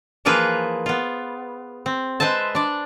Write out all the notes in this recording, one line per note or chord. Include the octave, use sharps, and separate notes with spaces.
E3 F3 A#3 F4 G#4 B4
B3 F4
C4
G#3 B4 C5 E5 A5
D4 D5